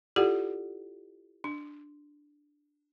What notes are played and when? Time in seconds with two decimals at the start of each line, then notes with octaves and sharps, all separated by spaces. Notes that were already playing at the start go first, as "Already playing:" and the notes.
0.16 E4 F4 G4 A4 D5 F#5
1.44 D4